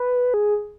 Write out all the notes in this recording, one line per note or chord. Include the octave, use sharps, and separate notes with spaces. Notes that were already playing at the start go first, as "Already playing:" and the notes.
Already playing: B4
G#4